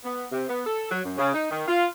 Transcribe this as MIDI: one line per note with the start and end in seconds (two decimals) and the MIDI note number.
0.04 0.26 59
0.32 0.44 48
0.49 0.65 59
0.66 0.90 69
0.91 1.00 54
1.04 1.17 42
1.18 1.31 49
1.34 1.50 63
1.51 1.63 51
1.68 1.87 65